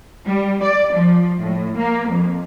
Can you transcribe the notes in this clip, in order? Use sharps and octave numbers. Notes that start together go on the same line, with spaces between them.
G3
D5
F3
A2
A#3
F2